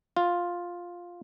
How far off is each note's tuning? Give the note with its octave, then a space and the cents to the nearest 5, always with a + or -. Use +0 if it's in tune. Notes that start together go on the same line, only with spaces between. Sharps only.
F4 +5